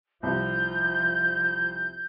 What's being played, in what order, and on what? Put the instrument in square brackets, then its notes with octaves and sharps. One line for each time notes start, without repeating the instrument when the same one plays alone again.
[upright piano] C2 [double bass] F3 [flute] G6